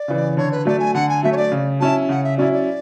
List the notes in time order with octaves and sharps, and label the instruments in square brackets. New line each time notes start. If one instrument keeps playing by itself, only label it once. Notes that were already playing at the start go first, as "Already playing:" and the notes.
Already playing: [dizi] D5
[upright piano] C#3 E3
[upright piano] D3 [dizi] C#5
[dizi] B4
[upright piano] F#3 A3 [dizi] D5
[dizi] G#5
[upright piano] D3 [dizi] F#5
[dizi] G#5
[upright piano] F#3 A3 [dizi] E5
[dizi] C#5
D5
[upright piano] C#3
[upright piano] F#3 C#4 E4 [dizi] A5
[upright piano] C#3 [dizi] F#5
[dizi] E5
[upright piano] F#3 C#4 E4 [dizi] D5
[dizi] D5